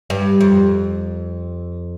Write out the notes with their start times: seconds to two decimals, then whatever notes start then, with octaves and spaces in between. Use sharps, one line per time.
0.10 G2
0.41 F2